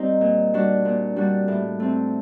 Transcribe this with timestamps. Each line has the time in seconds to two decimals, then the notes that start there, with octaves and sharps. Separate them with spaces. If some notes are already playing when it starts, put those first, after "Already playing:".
Already playing: G3 C4 D#4
0.21 A#2
0.53 G3 D4 F#4
0.85 A#2
1.16 G3 D4 F#4
1.48 A2
1.80 A3 C4